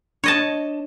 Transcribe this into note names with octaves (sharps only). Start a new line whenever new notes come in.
D4 C#5 D#5 A5